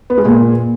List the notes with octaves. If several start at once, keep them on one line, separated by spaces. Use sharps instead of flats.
B3
G#3
A#2